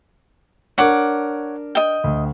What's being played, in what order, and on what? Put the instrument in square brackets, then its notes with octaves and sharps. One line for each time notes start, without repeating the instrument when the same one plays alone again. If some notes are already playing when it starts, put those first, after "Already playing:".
[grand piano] D4 A#4 [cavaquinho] C#5 F#5 D6
[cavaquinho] D#5 G5
[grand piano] D2